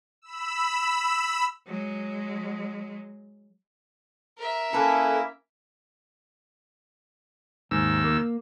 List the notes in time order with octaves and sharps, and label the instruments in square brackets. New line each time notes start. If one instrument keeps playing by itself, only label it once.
[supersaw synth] B5 E6
[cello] F#3 G#3
[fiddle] A#4 E5
[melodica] A#3 E4 [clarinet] C#4 [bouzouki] A4 B4
[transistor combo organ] D#2 E6 [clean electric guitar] G#2
[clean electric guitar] A#3